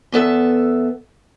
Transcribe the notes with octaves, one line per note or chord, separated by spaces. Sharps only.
E2 B3 A4 E5